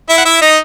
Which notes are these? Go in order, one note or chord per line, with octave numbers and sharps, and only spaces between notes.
E4 E5
F#5
E4 E5
D#4 D#5